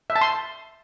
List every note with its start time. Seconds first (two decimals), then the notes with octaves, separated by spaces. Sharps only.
0.10 E5
0.16 A5
0.21 C6